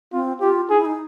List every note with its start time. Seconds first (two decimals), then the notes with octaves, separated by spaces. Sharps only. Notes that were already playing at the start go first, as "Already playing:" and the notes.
0.13 C4 F4
0.41 F4 G4
0.69 D#4 G#4
0.78 E4
0.86 D#4